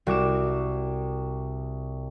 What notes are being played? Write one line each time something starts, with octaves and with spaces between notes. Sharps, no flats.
C2 F#4 D6 E7